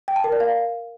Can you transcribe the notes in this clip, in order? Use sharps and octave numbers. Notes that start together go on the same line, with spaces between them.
G5
A5
A#4
D5
F5